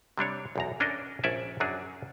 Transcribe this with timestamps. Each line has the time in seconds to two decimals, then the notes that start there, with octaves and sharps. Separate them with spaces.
0.18 C3 G3 D4 C#5
0.56 B1 E2 A#5
0.80 C#4 D4 A4 A#4 D#5
1.23 A#1 C#4 D5 E5 G#5
1.60 F#2 F#3 C#4 D4 G#4